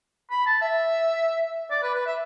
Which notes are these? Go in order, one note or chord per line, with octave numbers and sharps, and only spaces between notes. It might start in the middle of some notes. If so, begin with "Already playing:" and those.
B5
A5
E5
D5
B4
B4
E5